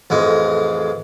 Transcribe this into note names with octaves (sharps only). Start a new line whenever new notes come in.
A1 F2 G#3